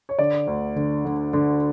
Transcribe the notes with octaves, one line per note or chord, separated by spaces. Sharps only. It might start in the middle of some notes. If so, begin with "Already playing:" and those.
C#5
D3 D5
D2
D3
D3
D3